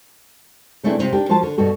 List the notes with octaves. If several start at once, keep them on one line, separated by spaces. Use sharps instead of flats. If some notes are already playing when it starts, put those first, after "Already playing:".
C#3 A3 C4 D4 E4 B4
C3 C4 F4
D4 D#4 G4 A#4
F3 F4 F#4 A#4 A5
D3
G2 B2 F#4 A4